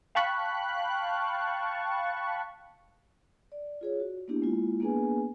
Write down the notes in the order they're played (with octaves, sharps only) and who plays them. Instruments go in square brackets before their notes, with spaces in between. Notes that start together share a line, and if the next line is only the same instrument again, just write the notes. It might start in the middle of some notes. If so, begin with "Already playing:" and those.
[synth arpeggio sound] F5 G5 A5 B5 C#6 F#6
[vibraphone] D5
F4 G#4 C#5
F#4
A#3 B3 D4 E4 G4
G#3 A#3 E4 F4
A#3 B3 D4 G#4 B4 G#5